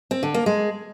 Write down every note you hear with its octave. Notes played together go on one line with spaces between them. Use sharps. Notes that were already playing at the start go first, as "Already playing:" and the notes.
C4
D3
A#3
G#3